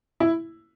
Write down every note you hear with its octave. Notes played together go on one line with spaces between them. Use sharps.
E4